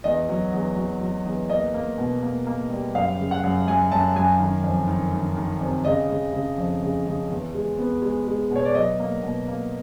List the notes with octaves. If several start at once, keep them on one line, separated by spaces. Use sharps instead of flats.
E2 D#5
F#3
E2
F#3
F#3
E2
A#3 D#5
A#3
B2
A#3
A#3
G3
F#2 F5
C#3
F#5
F#2
F#2 G#5
F#2 A5
F#2 G#5
D#3
F2
D#3
D#3
D#3
C3
C#3 D#5
C#3
C#3
F2
C#3
C#3
E2
G#3
B3
G#3
G#3
B2 C#5
D5
F#3 D#5
A#3
B2
A#3